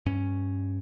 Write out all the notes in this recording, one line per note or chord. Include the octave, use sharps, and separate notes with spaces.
G2 C#4